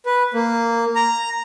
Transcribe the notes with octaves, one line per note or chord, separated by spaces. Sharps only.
B4
A#3
A#5